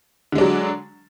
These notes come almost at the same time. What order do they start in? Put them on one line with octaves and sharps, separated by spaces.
D3 G#3 D4 F#3